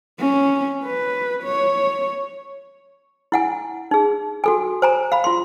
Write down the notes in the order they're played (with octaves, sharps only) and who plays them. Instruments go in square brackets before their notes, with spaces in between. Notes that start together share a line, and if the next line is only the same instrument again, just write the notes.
[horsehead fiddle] C#4
B4
C#5
[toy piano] E4 F#5 G#5
D#4 G#4
F#4 A4 G#5
C5 G#5 A#5
F5 B5
F4 C6